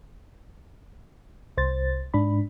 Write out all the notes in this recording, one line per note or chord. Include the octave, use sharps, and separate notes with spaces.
C2 C5 A6
G#2 D4 B5